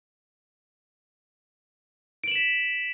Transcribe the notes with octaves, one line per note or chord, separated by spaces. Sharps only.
B6 D7 E7 F#7